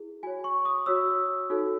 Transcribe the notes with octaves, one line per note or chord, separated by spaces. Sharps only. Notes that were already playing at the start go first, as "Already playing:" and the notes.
Already playing: E4 G#4
F#4 C#5 G#5
C#6
D#6
F#4 C#5 E6
D#4 F#4 A4 C#5